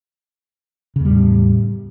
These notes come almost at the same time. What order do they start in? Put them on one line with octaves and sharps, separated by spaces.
C#3 E2 G3 A2